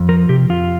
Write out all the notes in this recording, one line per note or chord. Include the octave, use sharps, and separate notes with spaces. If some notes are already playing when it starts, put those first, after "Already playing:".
Already playing: F2
F3 A#4
C3 G4
F2 F4